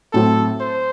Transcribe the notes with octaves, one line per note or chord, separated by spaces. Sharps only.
A2 F#3 C4 A4
C5